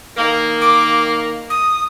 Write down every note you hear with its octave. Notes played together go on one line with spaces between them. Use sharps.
D#3 A#3
D6
D#6